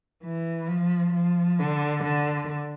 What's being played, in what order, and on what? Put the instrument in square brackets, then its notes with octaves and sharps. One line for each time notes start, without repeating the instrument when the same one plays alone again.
[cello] E3
F3
F3
D3
D3